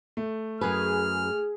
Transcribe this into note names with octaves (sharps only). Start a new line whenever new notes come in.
A3
F#2 G#4 B4 F6